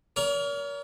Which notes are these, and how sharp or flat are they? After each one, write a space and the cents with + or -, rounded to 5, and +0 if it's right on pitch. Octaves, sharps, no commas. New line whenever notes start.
A#4 +10 C#5 +45